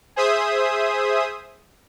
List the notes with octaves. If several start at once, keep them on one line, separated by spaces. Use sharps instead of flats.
G#4 C5 E5 D#6